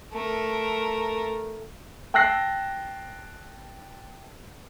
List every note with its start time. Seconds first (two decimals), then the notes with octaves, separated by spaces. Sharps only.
0.13 A3 A#4
2.14 G5 A5 E6 F#6 A#6 C7